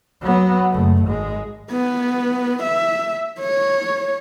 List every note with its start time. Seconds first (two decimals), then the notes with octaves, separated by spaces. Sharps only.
0.21 F#3 B3
0.70 F#1 A3
1.04 G#1 G#3
1.71 B3
2.63 E5
3.39 C#5